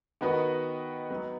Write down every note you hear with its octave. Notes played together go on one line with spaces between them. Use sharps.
D#3 B3 F#4 B4 D#5
F#3 B3 D#4